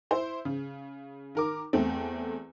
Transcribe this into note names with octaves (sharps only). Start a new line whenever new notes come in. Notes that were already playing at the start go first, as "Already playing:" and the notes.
E4 C5
C#3
D#3 A#4 D6
E2 A3 C4